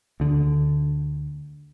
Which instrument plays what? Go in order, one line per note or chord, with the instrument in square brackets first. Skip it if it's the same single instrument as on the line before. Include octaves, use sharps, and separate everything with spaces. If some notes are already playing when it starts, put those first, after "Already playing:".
[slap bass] D2 D3